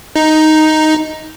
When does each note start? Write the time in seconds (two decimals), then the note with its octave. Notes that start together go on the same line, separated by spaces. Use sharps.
0.16 D#4